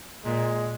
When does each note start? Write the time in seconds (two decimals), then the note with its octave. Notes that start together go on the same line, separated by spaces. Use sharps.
0.25 A#2 G#3